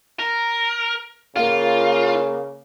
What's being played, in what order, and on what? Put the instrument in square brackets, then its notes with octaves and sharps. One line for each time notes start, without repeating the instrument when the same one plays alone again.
[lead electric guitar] A#4
[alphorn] C#3 [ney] A#3 [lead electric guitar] F4 [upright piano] F5